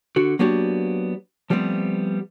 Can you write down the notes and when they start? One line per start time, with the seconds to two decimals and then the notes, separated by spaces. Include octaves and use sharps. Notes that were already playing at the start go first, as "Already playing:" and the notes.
0.16 D3 F#4
0.39 F#3 A#3 B3 D4 F#4 G4
1.50 F3 G3 A3 B3 C4